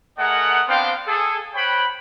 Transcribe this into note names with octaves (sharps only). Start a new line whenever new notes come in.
A3 G#4 A#4 D#5 F#5
B3 C4 D4 C5 F5 G5
G#4 A4
C5 C#5 F#5 G5 B5